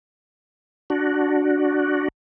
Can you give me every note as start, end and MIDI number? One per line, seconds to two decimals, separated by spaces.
0.90 2.08 62
0.90 2.08 66